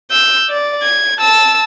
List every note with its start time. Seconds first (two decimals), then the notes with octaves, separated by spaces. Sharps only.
0.11 E6 G6
0.50 D5
0.83 G#6
1.19 A5 E6